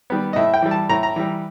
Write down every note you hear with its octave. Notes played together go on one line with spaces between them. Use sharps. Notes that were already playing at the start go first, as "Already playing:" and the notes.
D#3 G3 B3
D#5
A2 E5
G5
E3 G3
A5
A2 A#5
A#5
E3 G3